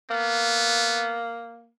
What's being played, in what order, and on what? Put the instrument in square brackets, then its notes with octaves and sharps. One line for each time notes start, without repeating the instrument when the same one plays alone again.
[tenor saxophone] A#3 [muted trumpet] B3